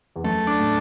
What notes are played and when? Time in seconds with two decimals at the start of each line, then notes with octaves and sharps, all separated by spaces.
0.16 E2
0.24 F#2 A3
0.47 D4
0.59 A2